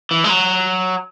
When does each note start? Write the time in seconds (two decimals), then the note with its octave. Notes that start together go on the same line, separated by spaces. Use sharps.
0.11 E3
0.24 G#3
0.29 F#3